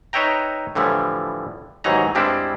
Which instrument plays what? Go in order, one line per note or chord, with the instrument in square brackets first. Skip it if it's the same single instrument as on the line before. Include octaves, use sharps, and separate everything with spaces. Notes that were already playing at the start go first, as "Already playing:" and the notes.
[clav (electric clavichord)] D#4 B4 C#5 E5 G5 A#5
A2 D3 E3 F3 G3
D#2 G#2 E3 F#3 D#4 A#5
G2 G3 G#3 C4 D4 E4